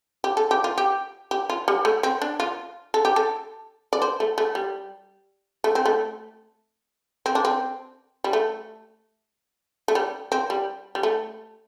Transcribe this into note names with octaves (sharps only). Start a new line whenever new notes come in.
G4
A4
G4
F4
G4
G4
F4
G3
A3
C4
D4
F4
A4
G4
A4
D5
C5
A3
A3
G3
A3
C4
A3
C4
D4
C4
G3
A3
A3
G3
C4
G3
G3
A3